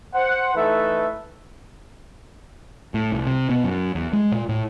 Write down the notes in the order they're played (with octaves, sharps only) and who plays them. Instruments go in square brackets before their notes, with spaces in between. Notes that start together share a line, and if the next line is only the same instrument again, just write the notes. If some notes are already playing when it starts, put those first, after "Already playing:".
[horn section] C5 F#5
E3 A3 D#4 A4 B4 E5
[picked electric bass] A2
C2
C3
B2
F#2
E2
G#3
A#2
A2